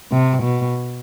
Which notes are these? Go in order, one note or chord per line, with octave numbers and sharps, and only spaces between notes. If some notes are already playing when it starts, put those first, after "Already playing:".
C3
B2